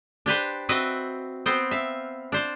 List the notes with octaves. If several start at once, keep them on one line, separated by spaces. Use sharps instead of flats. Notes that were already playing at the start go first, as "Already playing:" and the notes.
D4 G4 B4 C5
C4 F#4 B4 D#5 E5 G5
B3 C4 C5 G5
E5 F5
D4 C5 F5